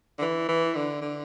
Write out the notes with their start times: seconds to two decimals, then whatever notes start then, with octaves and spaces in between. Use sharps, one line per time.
0.19 D3
0.22 E3
0.48 E3
0.75 D3
1.02 D3